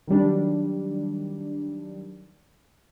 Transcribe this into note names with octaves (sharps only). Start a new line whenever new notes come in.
D#3 F#3 G3 D4